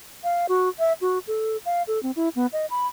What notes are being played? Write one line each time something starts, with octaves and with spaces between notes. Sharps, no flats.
F5
F#4
E5
F#4
A4
F5
A4
C4
E4
B3
D#5
B5